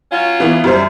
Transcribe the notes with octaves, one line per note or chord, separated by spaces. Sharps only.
F#3 C#4 F4
E3 B3
F#2 G3 C5